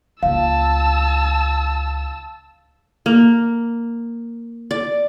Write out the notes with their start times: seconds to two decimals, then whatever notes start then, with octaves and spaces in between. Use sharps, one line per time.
0.23 C#2 A#3 F5 A5 E6
3.06 A#3
4.71 D5